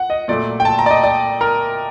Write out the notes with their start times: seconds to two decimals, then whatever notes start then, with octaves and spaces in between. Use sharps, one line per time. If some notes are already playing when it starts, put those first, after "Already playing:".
Already playing: F#5
0.10 D#5
0.28 A#2 F#3 A3 D5
0.60 G5
0.65 A5
0.79 A#5
0.86 D5
0.91 D#5
1.04 D5
1.41 A#4